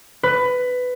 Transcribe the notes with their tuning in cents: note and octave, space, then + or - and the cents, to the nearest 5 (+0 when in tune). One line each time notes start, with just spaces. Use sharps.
B4 +15